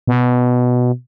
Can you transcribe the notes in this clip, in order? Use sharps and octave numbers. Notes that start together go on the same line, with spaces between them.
B2